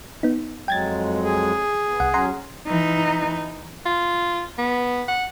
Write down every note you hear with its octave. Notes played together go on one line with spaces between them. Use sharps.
B3 D#4
F2 F#3 G#3 G5 G#6 A6
G#4
B3
C2 F#5
F#3 C#4 F#5 A#5 C6
E3 D#4
F4
B3
F#5